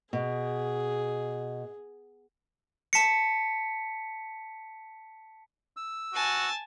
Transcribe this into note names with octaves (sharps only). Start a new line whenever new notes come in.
B2 G#4
A5 B6 C#7
E6
F#4 G#5 A5